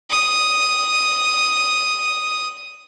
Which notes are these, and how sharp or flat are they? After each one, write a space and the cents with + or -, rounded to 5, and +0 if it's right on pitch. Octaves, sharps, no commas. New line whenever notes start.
D#6 +0